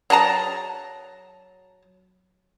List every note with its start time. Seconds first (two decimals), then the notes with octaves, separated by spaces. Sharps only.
0.10 F#3 G#4 A5 A#5